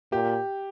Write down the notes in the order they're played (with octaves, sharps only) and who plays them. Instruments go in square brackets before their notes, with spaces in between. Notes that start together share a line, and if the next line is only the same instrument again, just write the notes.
[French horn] A#2 [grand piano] G4